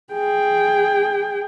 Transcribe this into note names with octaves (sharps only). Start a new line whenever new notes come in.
G#4 G5